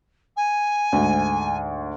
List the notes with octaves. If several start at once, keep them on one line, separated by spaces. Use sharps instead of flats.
G#5
D2 G#2